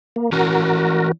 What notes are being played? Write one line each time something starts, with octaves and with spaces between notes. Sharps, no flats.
A#3
E3 C#4 F#4 A#4